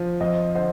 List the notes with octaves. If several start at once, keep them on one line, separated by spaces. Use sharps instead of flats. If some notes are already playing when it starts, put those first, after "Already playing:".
Already playing: F3
F2 C5 D#5
D3 C5 D#5